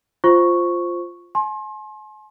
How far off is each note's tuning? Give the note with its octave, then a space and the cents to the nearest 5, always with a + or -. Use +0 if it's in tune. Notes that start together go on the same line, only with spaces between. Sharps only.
F4 +0 C5 +0 C#6 +0
G#5 +45 C6 +35